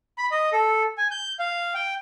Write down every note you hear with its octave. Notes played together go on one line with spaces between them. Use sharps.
B5
D#5
A4
G#5
G6
F5
G5